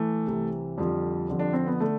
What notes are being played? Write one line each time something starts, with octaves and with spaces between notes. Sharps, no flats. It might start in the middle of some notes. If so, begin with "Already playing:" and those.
Already playing: E3 A3
C2 C3 E3
F2 D3 F3 G3
F2 D3 F3
D4
C4
B3
D3 A3